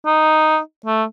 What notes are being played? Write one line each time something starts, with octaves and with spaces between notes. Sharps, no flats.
D#4
A3